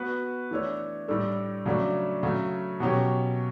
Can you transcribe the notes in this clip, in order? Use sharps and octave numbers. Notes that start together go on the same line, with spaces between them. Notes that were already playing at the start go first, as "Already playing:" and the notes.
Already playing: B3 F#4 B4
E3 A3 D4 A4 C#5
A2 G3 D4 A4
C#3 F#3 A3 D4
C#3 F#3 A3
B2 F#3 C#4 G4